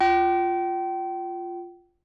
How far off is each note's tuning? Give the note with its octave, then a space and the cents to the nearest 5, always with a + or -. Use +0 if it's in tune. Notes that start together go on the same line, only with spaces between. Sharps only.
F4 +0 G5 -30